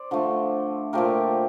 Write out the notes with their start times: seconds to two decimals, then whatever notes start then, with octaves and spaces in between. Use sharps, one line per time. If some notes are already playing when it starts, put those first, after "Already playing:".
Already playing: C5 D5
0.11 D3 F3 A3
0.93 A#2 F3 A3 G4 A#4